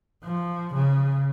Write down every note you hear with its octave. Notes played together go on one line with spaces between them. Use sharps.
F3
C#3